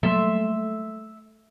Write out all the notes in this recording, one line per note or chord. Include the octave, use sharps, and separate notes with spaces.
F#3 G3 A3 A#3 E5 C6